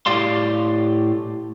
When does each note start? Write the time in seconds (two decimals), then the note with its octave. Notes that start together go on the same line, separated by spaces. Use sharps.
0.06 A2 G4 D5 F5 C6